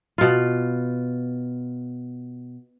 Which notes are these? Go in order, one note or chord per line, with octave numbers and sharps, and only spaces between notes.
B2 F4